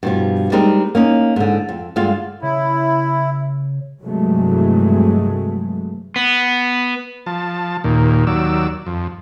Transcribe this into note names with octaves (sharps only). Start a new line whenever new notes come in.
G2 B2 F3
G3 G#3 C4 D#4 G4 A#4
A#3 C#4 D#4
G#2 D3
F2
G2 D3 G#3 F4 F5
C#3 E4
G2 C3 E3 F#3 G#3 A3
B3
F3 A5
D#2 A#2
D#2 F#3 D5 E6
F2